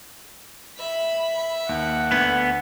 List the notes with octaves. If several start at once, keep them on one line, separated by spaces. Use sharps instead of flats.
E5 B5
D#2 F#5
D2 D3 B3 G#6